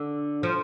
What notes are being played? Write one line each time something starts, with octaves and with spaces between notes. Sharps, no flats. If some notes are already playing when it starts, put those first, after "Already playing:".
Already playing: D3
F3